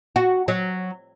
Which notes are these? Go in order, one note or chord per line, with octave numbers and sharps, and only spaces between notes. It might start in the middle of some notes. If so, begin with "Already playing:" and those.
F#4
F#3